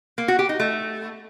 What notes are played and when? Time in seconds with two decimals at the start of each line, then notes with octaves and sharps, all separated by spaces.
0.18 A#3
0.28 F#4
0.39 G4
0.49 D#4
0.60 A3